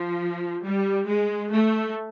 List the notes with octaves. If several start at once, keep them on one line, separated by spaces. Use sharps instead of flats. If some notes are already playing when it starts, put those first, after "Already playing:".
Already playing: F3
G3
G#3
A3